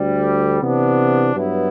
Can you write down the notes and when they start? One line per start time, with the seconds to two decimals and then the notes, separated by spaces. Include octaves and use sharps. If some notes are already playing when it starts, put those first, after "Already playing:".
Already playing: D2 D3 G3
0.61 C3 E3 B3 D4
1.35 G2 F#3 B3 E4